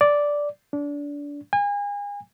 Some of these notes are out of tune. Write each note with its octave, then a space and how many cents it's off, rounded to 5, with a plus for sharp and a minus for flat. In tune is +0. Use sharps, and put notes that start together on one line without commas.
D5 -5
D4 -25
G#5 -35